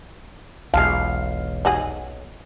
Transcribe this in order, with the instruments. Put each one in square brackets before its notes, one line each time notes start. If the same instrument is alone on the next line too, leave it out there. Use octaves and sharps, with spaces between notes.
[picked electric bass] E1 [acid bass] B1 [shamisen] G#3 A5 [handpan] F5
[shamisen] D#4 F#4 G#4